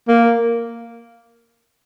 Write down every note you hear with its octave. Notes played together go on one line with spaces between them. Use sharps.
A#3